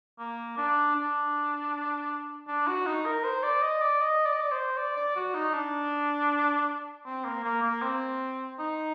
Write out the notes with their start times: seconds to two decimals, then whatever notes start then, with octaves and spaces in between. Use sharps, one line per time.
0.19 A#3
0.58 D4
0.96 D4
2.48 D4
2.67 F#4
2.86 D#4
3.06 A#4
3.24 C5
3.43 D5
3.62 D#5
3.82 D5
4.01 D#5
4.26 D5
4.34 D#5
4.41 D5
4.51 C5
4.77 D5
4.96 D5
5.16 F#4
5.34 D#4
5.54 D4
7.06 C4
7.25 A#3
7.44 A#3
7.63 A#3
7.82 C4
8.59 D#4